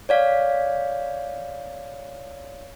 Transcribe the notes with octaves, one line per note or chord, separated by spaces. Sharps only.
C#5 D5 F5